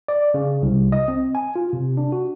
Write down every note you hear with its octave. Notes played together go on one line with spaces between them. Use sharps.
D5
C#3
C2
D#5
C4
G#5
F4
C3
D4
F#4